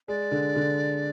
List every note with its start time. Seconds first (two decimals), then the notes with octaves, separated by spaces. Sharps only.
0.08 G#3 D5
0.31 D3
0.56 D3